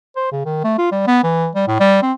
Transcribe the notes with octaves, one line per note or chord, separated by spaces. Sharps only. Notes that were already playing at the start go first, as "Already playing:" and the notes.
C5
C#3
D#3
A3
F4
G3
B3
E3
G3
A2
G3
C4